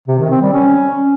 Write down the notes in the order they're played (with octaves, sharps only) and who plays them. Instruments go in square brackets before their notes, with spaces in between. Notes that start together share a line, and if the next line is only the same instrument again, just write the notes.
[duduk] C3
D#3
C4
G3
C#4